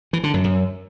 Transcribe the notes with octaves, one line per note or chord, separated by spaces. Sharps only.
E3
D3
F#2
F#2